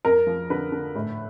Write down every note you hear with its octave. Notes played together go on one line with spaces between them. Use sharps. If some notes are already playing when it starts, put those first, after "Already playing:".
F2 A#4
F3
D3 B4
D3
A2